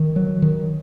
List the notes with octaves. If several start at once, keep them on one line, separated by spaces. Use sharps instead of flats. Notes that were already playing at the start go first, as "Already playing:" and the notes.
Already playing: D#3
F#3
D#3